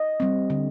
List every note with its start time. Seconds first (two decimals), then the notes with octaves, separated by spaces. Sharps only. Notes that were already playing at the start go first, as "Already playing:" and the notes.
Already playing: D#5
0.20 G3 C4
0.50 D3